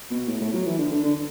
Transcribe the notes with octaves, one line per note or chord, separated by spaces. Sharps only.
B2
A2
A2
F#3
E3
D3
D3
D3